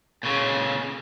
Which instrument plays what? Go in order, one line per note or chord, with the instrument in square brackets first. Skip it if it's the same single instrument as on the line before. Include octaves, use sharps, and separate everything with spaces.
[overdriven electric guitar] A#2 C#3